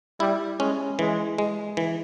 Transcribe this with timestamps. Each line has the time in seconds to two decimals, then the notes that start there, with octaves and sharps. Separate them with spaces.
0.20 G3 E4
0.59 G#3 C#4
0.99 E3 G#3
1.38 G#3
1.77 E3